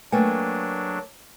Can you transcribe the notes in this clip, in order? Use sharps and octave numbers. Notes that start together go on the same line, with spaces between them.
F#3 A3 A#3 D4 B4 G5 G#5